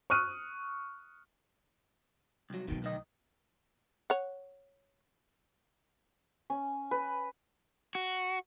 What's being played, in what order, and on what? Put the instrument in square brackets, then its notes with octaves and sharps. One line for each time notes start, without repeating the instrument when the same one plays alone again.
[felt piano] C#6 D#6 F6 F#6 D#7
[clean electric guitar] C2 F#3
[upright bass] B1 D#4 [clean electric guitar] B2 D#3
[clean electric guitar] D2 D#3 D#5
[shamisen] C#5 F#5
[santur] C#4
B4
[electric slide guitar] F#4